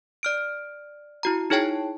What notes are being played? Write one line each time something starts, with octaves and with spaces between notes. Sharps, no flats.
D5 F6 D7
E4 F#4 A#5
D#4 E4 G#4 C#5 G5 A5